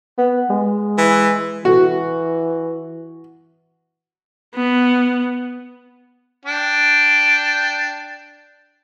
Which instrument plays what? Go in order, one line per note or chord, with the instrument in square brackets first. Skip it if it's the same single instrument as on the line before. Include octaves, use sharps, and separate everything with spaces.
[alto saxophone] B3
G#3
[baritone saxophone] E3
[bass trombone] E3 [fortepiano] F#4
[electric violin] B3
[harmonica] D4 G5